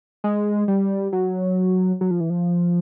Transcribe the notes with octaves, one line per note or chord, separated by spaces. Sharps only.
G#3
G3
F#3
F#3
F3
E3
F3